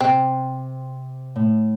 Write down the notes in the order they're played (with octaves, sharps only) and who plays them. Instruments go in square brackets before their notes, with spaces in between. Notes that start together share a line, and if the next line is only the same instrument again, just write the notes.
[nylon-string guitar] C3 [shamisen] C4
[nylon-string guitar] A2